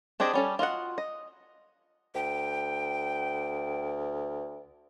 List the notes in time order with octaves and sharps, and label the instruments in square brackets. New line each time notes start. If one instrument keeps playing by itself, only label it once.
[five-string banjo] C4 D4 G4 G#4 D#5
G3 C#4 A4
F4 F#4 D#5 F#5
D#5
[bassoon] D2 [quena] G5